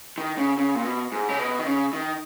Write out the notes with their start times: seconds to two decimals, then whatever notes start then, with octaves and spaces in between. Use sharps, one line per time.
0.18 D#3
0.38 C#3
0.58 C#3
0.75 A#2
0.85 B2
1.12 G#2
1.29 C#3
1.39 B2
1.59 D#3
1.66 C#3
1.93 D#3